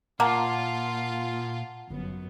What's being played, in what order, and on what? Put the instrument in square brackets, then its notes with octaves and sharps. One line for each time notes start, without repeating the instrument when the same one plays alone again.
[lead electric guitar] A#2 [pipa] A#3 [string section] F4 [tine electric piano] F#5 A5 A#5
[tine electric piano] G1 [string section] F#2 B3